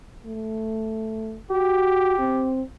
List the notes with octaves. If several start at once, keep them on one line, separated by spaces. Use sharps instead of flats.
A3
F#4 G4
C4